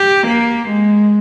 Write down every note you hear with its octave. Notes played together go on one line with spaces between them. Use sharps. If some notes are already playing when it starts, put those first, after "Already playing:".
Already playing: G4
A#3
G#3